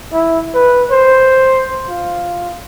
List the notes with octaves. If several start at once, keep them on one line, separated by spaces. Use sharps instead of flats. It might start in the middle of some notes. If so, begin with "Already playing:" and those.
E4
B4
C5
F4